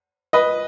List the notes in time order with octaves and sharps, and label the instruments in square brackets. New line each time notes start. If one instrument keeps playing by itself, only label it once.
[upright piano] B4 D#5